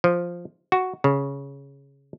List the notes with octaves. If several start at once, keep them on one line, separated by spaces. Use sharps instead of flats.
F3
F#4
C#3